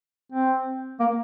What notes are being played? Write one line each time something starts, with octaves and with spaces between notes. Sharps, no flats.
C4
A#3